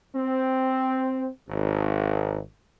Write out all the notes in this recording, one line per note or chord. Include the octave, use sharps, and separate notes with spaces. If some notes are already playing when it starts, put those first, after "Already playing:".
C4
G#1